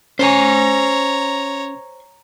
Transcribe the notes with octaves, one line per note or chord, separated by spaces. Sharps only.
C#4 C5 C#5 G#5 A#5